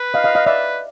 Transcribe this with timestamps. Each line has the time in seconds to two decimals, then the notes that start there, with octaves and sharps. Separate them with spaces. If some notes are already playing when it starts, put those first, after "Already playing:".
Already playing: B4
0.14 D#5 F5
0.24 D#5 F5
0.35 D#5 F5
0.46 B4 D5 E5